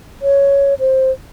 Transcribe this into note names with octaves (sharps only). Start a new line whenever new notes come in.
C#5
C5